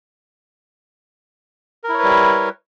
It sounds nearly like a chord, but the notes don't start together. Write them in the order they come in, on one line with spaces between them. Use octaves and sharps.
A#4 E4 C#5 B4 G3